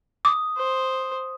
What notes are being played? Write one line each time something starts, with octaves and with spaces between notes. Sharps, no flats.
D6 D#6
C5